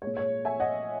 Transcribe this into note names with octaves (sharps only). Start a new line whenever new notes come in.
A#2 G#3 C#5
C#5
E5 G#5
D#5 F#5